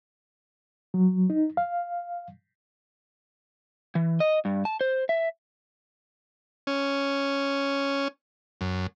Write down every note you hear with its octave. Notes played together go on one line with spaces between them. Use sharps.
F#3
D#4
F5
E3
D#5
G2
A5
C5
E5
C#4
F#2